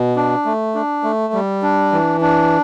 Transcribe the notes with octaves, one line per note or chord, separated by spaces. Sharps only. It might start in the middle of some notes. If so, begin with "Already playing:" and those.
Already playing: B2
D4
A3
D4
A3
G3
D4
E3
D4